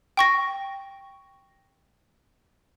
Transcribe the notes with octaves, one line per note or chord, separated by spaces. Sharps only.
G5 C#6 A#6